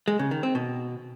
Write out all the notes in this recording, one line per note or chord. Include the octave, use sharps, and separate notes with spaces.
G#3
C#3
D#3
C4
B2